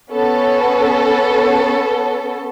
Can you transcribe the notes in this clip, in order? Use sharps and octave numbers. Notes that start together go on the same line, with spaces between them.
B3 C#4 A4